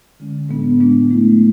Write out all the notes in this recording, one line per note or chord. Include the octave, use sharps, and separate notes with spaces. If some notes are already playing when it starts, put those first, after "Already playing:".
D3 G#3 C#4
A2 G#3 B3 D4
A2 G#3 B3 D4
F#3 A3 E4